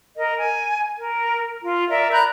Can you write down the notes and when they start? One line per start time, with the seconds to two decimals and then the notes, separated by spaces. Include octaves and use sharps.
0.16 A#4 D#5
0.40 G#5
0.98 A#4
1.64 F4
1.90 A#4 D5 E5
2.12 A#5 B5 F#6 G6